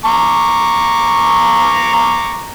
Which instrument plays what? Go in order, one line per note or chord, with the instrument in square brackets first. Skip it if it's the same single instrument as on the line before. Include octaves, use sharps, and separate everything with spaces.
[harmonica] A#5 C#6 D6